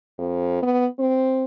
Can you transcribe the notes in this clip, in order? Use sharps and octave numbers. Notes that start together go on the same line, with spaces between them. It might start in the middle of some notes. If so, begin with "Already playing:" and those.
F2
B3
C4